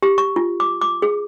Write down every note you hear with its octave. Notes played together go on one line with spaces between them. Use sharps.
G4
C#6
F4
D6
D6
G#4